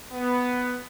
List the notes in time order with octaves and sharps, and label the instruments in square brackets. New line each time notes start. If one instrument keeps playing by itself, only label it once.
[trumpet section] B3